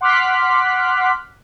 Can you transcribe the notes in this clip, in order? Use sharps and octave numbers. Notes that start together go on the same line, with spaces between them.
F#5 C6 D6 F6 F#6 B6